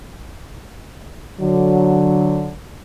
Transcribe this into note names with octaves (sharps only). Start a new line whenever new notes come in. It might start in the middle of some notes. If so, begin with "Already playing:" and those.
D3 F#3